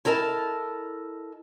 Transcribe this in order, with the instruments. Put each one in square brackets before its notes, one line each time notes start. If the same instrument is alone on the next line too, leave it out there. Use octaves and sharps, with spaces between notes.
[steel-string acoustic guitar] E4 A4 A#4 D#5 A5